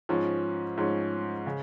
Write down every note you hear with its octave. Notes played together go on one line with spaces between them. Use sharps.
G#2 F3 C#4
G#2 F3 C#4
C#3